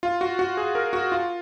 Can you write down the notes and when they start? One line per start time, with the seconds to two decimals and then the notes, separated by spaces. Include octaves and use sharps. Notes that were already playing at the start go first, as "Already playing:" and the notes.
0.03 F4
0.21 F#4
0.39 F#4
0.57 G#4
0.75 A#4
0.93 F#4
1.12 F4